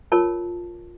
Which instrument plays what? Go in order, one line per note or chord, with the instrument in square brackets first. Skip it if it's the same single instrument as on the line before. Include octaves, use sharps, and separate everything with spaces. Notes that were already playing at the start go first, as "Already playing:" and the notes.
[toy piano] F4 A#4 C#5 A5